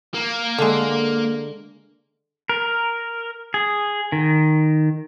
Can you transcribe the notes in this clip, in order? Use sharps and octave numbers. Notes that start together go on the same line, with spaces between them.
A#3
D3 G#3
A#4
G#4
D#3